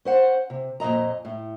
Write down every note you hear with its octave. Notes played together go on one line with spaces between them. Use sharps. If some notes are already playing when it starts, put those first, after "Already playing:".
C#4 C5 F#5
C3
F2 A#2 G#3 D#5 A#5
A2